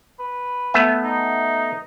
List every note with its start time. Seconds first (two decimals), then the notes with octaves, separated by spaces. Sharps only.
0.19 B4
0.74 A3 B3 E5
1.04 D#4